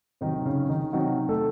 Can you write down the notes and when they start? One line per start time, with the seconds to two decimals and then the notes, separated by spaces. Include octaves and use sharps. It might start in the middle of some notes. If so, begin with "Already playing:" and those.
0.21 C3 D#3 F#3 D#4
0.45 C#3 C#4
0.69 D#3 D#4
0.93 C3 D#3 F#3 F#4
1.29 A3 A4